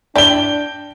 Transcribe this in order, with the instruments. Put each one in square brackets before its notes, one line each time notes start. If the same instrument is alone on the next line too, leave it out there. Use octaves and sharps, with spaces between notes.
[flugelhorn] D4 [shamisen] E4 D5 [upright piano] G5 G7